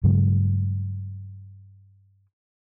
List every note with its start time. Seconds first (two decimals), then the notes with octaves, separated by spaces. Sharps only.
0.04 G2 C#3 F#3 G#3